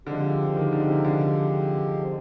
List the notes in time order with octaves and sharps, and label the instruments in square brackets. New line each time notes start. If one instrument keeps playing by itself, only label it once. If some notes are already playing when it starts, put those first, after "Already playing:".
[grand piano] D3 [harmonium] F3 G#3 C4 G4
[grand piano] D#3
D3
C3
D3